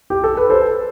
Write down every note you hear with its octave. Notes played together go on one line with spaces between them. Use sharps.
G4
A4
B4
A4 C5